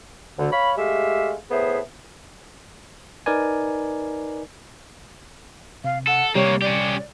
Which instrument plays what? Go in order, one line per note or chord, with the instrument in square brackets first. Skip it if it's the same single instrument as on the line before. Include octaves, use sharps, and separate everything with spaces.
[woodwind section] D2 D3
C#5 F5 B5
G#3 A3 G4 E5 F5
A2 B3 G#4 C5 E5
[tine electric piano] D#4 A#4 B4 D5 G#5
[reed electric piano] C3 [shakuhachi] F5
[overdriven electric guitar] A4 [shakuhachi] F#5
[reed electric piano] C3 G3 [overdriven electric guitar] A#3 G4 [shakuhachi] C#5
[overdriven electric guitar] C#4 G4 [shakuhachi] D5